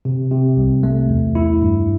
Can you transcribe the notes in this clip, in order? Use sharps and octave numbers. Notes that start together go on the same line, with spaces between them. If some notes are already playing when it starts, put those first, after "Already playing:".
C3
C3
C2
A3
E2
E4
G2